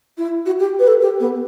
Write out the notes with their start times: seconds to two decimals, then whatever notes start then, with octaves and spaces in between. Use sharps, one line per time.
0.17 E4
0.45 F#4
0.59 G4
0.79 B4
0.87 A4
1.01 G4
1.19 B3